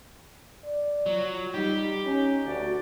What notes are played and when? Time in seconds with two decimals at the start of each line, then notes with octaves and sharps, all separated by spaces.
0.64 D5
1.06 F#3 F4
1.54 G3 D#4 G4 B5
2.05 C#4 D#4
2.45 D2 F#4 D5